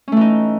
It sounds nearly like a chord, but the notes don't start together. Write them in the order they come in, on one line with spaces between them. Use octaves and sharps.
C#4 A3 E3 D#4